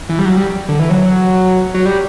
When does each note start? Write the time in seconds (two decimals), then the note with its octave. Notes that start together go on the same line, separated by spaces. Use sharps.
0.09 E3
0.19 G3
0.26 F#3
0.37 G3
0.69 D3
0.79 E3
0.90 F#3
1.75 F#3
1.86 G3